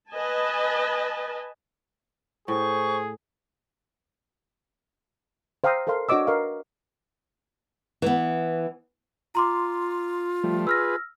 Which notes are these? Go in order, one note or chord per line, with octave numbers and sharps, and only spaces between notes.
B4 D#5 G#5 A5
A2 G#4 C5 C#6
C5 F5 G5 A#5 D#6 E6
A4 A#4 C5 F5 C6
D4 F#4 C#5 D#5 D6 E6
A#4 B4 D#5 F5 C#6
E3 B3
F4 A#5 C6 D6
F3 G3 A3
G#4 B4 E6 F6 A#6